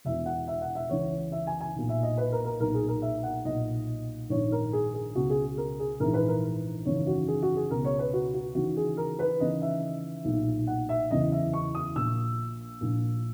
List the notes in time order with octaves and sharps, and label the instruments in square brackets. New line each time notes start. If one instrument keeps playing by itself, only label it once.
[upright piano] E1 E2 B2 E5
F#5
E5
F#5
E5
C#2 C#3 E3 C#5
E5
G#5
G#5
B1 A#2
E5
D#5
B4
A#4
A#4
B1 A#2 A#4
G#4
A#4
E5
F#5
B1 A#2 D#5
A#1 G#2 D#3 C#5
A#4
G#4
G#4
C#2 B2 F#4
G#4
A#4
G#4
A#1 G#2 E3 A#4
B4
A#4
G#1 F#2 C#3 E3 C#5
F#4
G#4
F#4
G#4
C#2 B2 A#4
C#5
B4
F#4
F#4
D#2 C#3 E3 F#4
G#4
A#4
B4
D#2 C#3 E3 D#5
E5
B1 A#2
F#5
E5
F#1 E2 C#3 E3 D#5
E5
C#6
D#6
A#1 A#2 E6
A#1 A#2